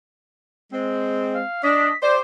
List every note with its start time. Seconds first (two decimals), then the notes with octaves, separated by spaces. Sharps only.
0.73 G#3 C4
1.34 F5
1.63 D4 D#5 B6
2.03 G4 C5 D5